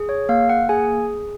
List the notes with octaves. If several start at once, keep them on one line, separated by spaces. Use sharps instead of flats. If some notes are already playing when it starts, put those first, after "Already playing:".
Already playing: G#4
C#5
A#3 F5
F#5
G#4 G#5